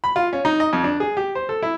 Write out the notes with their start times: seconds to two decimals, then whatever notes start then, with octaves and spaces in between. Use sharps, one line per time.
0.04 B5
0.16 F4
0.33 C#4
0.45 D#4
0.60 D#5
0.73 F2
0.84 D4
1.00 G#4
1.17 G4
1.35 C5
1.49 A4
1.62 E4